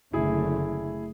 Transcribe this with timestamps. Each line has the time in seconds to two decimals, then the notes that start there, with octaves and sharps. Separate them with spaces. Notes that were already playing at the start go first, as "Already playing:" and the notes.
0.13 F#1 D3 A3 E4 G#4